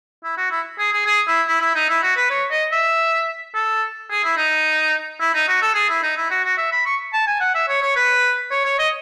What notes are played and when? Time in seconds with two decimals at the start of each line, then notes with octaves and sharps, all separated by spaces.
0.23 E4
0.37 F#4
0.51 E4
0.78 G#4
0.92 G#4
1.06 G#4
1.27 E4
1.47 E4
1.61 E4
1.75 D#4
1.89 E4
2.02 F#4
2.16 B4
2.30 C#5
2.51 D#5
2.72 E5
3.54 A4
4.10 G#4
4.23 E4
4.37 D#4
5.20 E4
5.34 D#4
5.47 F#4
5.62 A4
5.74 G#4
5.89 E4
6.03 D#4
6.17 E4
6.30 F#4
6.44 F#4
6.58 E5
6.72 B5
6.86 C#6
7.13 A5
7.27 G#5
7.40 F#5
7.55 E5
7.68 C#5
7.82 C#5
7.96 B4
8.51 C#5
8.65 C#5
8.79 D#5